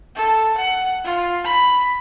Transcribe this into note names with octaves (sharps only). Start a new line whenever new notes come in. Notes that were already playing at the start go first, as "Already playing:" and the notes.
A4
F#5
F4
B5